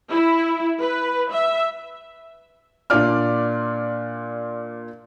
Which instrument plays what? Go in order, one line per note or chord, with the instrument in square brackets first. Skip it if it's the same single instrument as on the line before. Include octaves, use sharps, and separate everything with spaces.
[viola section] E4
B4
E5
[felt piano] A#2 D4 F4 D5 F6